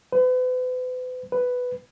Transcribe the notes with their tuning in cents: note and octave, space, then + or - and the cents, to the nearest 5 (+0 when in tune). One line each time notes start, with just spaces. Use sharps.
B4 +40
B4 +5